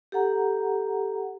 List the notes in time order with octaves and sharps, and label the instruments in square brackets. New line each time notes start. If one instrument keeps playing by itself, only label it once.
[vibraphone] G4 A4 F#5 A#5